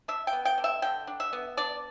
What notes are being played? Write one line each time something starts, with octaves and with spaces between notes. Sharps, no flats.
D4 E5
G5
B3
G5
D3
E5
D3 G5
D4
E5
B3
D4 D5